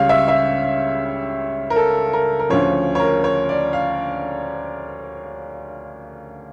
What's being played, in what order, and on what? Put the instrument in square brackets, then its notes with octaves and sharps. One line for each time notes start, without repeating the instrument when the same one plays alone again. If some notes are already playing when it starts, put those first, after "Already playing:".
Already playing: [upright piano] C#2 C#3 G3 C#5 F5
E5
E5
A#4
A4
A#4
A#4
D2 C#3 F3 C#5
C#5
A#4
C#5
D5
F5